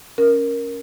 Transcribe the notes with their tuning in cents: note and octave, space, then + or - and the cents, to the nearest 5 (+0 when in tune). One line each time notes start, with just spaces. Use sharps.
C#4 +0 A#4 +5